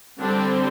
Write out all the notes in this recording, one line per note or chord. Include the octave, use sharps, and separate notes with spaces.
D3 G3 C4 D4